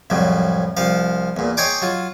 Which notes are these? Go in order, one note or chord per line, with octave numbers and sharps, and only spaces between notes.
C2 F2 A2 F#3
C2 F3 F5
E2 A#2
C#5 D#5 G5 G#5 C6 D6
F#3 F4